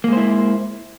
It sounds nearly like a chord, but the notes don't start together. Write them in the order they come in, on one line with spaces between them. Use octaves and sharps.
A#3 G#3 C5 E4